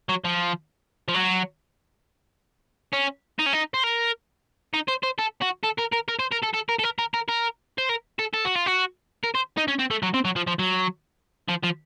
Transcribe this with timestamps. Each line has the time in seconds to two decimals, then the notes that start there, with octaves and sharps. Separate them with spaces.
0.09 F#3
0.24 F3
1.08 F3
1.14 F#3
2.93 C#4
3.39 D#4
3.46 C#4
3.53 D#4
3.74 C5
3.84 A#4
4.74 D#4
4.88 C5
5.03 C5
5.19 A4
5.42 F#4
5.64 A4
5.79 A#4
5.93 A#4
6.09 A#4
6.19 C5
6.32 A#4
6.43 A4
6.54 A4
6.69 A#4
6.79 A4
6.84 A#4
6.99 A#4
7.14 A#4
7.28 A#4
7.78 C5
7.89 A#4
8.19 A4
8.33 A4
8.45 F#4
8.55 F4
8.66 F#4
9.24 A#4
9.35 C5
9.58 D#4
9.68 C#4
9.79 C4
9.91 A3
10.03 F#3
10.14 C4
10.25 F#3
10.36 F3
10.47 F3
10.59 F#3
11.48 F3
11.63 F3